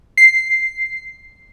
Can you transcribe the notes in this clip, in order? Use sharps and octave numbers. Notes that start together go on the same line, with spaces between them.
C7